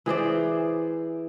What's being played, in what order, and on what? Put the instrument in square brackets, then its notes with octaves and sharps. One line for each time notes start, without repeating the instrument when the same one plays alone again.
[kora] E3 G#4 C5 D5